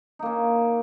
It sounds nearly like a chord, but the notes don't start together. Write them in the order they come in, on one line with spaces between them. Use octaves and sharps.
D#4 A#3 C#4